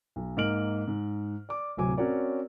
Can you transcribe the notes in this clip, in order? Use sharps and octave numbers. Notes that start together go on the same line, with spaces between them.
B1
G#2 A#3 D#5 F6 D7 F#7
G#2
D5 D6
D1 C3 F#3 G#5 D6
C4 C#4 F#4 A#4 C#5 D5